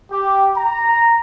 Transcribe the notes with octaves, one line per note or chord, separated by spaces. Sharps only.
G4
A#5